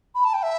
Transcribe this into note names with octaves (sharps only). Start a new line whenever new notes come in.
B5
A5
G5
E5